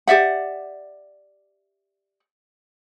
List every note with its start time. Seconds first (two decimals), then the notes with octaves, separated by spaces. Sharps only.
0.07 G4 D5 E5 F#5